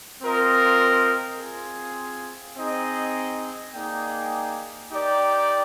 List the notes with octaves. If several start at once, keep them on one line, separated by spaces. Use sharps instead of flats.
C4 F4 A#4 D#5
C4 F4 G#4
C4 D#4 G#4 D#5
A#3 D#4 G#4 D5 G5
D#4 G4 A#4 D5 G5